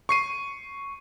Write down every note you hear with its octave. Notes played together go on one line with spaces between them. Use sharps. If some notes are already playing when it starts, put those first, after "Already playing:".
C#6 C7 D#7